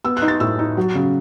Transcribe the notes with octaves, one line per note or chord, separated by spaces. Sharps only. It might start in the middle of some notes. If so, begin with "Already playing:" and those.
B3 E6
F#6
D#4
A6
A2 E6
D#4
F#3
C#3